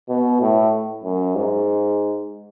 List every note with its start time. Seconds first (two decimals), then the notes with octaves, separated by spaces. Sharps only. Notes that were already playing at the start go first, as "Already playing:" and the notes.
0.09 B2
0.41 A2
1.04 F#2
1.36 G#2